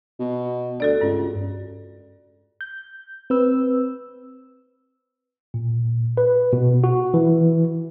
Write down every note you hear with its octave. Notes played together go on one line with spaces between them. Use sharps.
B2
D2 F#4 A4 D5
C#2 G2
G6
C4 B4 E6
A#2
B4
B2
F#4
E3